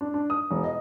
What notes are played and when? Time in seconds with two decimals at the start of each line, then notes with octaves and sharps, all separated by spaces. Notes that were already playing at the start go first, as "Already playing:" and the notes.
0.01 D4
0.14 D4
0.30 D#6
0.51 E1
0.64 D#5